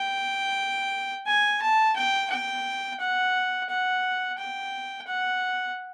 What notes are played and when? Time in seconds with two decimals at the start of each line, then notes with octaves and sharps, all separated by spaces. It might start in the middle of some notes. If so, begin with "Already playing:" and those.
Already playing: G5
1.27 G#5
1.62 A5
1.96 G5
2.30 G5
3.00 F#5
3.69 F#5
4.38 G5
5.07 F#5